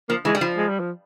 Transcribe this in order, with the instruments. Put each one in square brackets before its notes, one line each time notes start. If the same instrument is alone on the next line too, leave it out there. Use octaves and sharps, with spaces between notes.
[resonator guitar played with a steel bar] F3 [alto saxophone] A#3
[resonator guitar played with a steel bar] E3 [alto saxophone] G#3
[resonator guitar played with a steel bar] G3
F3
[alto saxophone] G#3
G3
F3